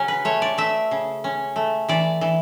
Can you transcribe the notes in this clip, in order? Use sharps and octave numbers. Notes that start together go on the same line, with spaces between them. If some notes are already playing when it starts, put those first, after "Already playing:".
Already playing: C#3 F#3 C#4
B4
A3 C#5
D5
A3 E5
C#3
C#4
A3
E3 D5
E3